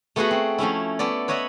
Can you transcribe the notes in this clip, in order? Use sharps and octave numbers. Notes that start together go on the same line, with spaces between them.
A3 B3 F4 F#4 G#4 F#5
C4
F3 A3 C#4 E4
A3 B3 A4 D5
B4 C#5 D#5 E5 F#5